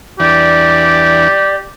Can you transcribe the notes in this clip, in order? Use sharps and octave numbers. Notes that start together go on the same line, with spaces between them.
E2 E3 D4 G4 D5